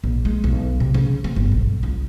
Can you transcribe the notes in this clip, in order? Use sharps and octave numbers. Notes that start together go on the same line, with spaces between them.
A#1
G#3
B1
C3
C#3
C4
G1
B1
C#2